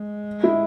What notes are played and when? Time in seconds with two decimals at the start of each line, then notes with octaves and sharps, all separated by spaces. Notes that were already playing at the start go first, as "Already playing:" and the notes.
Already playing: G#3
0.44 E4